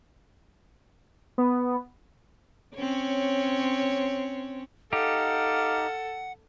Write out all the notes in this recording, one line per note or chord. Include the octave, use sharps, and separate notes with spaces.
B3
C4 C#4 C#5
D#4 G4 A4 F5 F#5